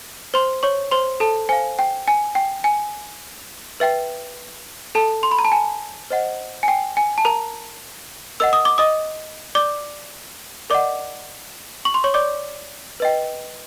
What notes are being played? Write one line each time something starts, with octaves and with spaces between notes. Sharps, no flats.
C5 C6
C#5 C#6
C5 C6
A4 A5
C5 F5 G#5
G5
G#5
G5
G#5
B4 E5 G5
A4 A5
C6
B5
A#5
A5
G#5
C5 D#5 F#5
G#5
G5
G#5
A5
A#4 A#5
A#4 D#5 F#5 E6
D#6
D6
D#5 D#6
D5 D6
A#4 D5 D#5 F#5 D6
C#6
C6
C#5 C#6
D5 D6
B4 D#5 G5